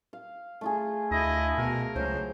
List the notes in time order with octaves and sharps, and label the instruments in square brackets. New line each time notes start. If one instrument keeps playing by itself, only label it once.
[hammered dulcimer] F5
A3 F4 G#4
[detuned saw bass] D2 [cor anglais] E4 [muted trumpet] D#5
[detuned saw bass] B2 [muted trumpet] A#4
[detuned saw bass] C#2 [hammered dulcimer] F#3 F#4 [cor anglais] C5